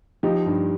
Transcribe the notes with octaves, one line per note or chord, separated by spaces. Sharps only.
F3 D#4 G4
G2